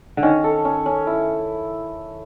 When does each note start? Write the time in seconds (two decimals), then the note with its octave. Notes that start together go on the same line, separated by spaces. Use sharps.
0.17 D3
0.23 D#3 C#4
0.44 A4
0.65 C#4
0.86 C#4
1.07 E4